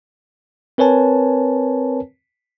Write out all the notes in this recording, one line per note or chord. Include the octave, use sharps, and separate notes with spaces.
C4 A#4 B4 C#5 G#5 A5